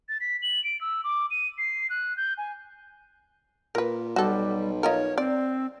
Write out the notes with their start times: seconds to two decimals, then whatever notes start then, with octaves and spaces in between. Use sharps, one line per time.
0.09 A6
0.21 B6
0.42 F#7
0.64 D7
0.81 E6
1.04 D6
1.31 D#7
1.58 C7
1.90 F#6
2.17 G6
2.38 G#5
3.75 A#2 A#4 B4
4.16 B1 G3 F#4 A4
4.83 D#4 F4 A#4 C#5
5.18 C4 D5